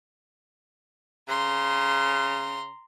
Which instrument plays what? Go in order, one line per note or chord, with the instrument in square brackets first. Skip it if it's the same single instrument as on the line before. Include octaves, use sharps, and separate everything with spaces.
[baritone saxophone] C#3 [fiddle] A#5 C6